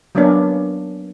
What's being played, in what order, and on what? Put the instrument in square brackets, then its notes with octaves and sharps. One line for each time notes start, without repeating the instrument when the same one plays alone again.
[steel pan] F#3 A#3 B3 C#4 D4